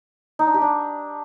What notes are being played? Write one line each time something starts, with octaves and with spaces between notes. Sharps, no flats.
D#4
D4
G4
D4